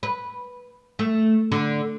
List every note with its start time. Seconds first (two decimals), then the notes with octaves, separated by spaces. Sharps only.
0.03 B4
0.99 A3
1.52 D3